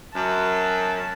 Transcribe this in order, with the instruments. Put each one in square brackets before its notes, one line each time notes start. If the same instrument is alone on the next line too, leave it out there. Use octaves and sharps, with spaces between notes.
[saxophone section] F#2 [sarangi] A5